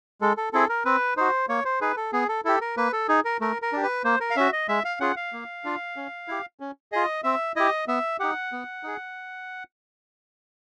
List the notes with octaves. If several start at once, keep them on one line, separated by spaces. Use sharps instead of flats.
G#3 A4
A4
C4 E4 G#4 A4
A#4
C4 B4
D#4 F#4 C5
A#3 C#5
C5
D#4 G#4 B4
A4
B3 G#4
A4
E4 G4 A4
A#4
A#3 B4
A4
D#4 G#4
A#4
A3 A#4
A#4
D4 G4
B4
A#3 C5
A#4
F5
C#4 F#4 E5
D#5
G#3 E5
F5
C#4 F4 G#4 F#5
F5
A#3
D4 F4
C#4
E4 G4
C#4
F4 G#4 D#5
C4 E5
E4 G4 D#5
B3 E5
D#4 G4 F#5
B3
D#4 G#4